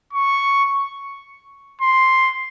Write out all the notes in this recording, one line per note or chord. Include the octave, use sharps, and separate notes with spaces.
C#6
C6